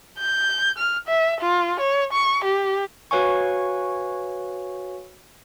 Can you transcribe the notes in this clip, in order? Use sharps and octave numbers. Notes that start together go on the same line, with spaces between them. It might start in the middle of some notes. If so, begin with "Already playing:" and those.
G6
F6
E5
F4
C#5
C#6
G4
F#4 B4 C#5 F5 G#5 C#6